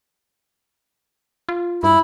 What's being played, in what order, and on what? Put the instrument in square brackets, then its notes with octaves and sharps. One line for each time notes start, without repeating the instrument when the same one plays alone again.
[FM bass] F4
[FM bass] G2 [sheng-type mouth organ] E4